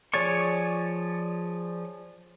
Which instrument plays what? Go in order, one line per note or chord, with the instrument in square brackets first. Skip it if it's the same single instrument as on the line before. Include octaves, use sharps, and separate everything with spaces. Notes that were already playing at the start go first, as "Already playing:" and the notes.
[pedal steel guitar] F3 G#4 C#5 D5 C#6